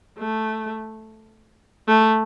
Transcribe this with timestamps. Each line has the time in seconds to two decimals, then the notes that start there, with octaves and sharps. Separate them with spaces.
0.18 A3
1.88 A3